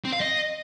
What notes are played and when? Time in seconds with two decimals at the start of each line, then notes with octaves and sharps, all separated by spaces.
0.05 C4
0.13 F5
0.22 D#5